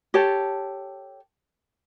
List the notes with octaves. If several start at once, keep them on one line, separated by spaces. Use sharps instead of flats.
G4 A4 C#5 A5